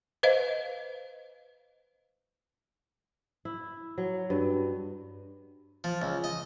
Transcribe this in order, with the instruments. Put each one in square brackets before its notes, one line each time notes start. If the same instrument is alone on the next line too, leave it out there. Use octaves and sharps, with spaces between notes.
[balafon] B4 C5 D#5 F5
[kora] E4
F#3
G2
[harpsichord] F3
C#2
D#5